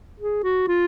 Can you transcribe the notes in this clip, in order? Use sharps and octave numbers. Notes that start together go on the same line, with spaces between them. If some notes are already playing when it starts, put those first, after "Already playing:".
G#4
F#4
F4